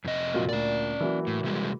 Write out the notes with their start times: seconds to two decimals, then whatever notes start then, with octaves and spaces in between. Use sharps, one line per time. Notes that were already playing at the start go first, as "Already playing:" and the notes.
0.04 F2 C3 D#5
0.34 A#2 F#3 F4
0.49 D2 A#2 C#4 D5
1.01 E3 F#3 A#3
1.27 A2
1.44 C3 G3 G#3